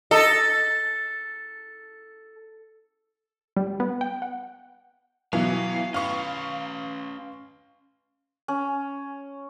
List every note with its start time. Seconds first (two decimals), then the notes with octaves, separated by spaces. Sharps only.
0.11 A4 D#5
3.57 G3
3.80 B3
4.01 G5
4.22 F#5
5.33 B2 E3 F#3 F5
5.94 C#4 B4 F5 C#6
8.48 C#4